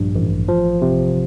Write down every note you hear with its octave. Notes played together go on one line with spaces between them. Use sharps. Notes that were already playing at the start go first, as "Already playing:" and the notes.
Already playing: A#1 G2
A1
F3
C3